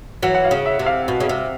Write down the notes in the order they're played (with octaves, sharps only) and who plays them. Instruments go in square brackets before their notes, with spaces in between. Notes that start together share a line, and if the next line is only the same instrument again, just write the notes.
[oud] E3 F#3 [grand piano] F#5
[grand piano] F#5
F5
[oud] C#3
[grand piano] E5
[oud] C3
[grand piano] F5
[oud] B2
C#3
C3